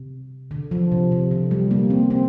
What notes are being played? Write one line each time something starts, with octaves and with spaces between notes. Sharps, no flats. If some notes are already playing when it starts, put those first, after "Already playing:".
Already playing: C3
D3
F3
C3
C3
D3
G3
A#3
C4
C4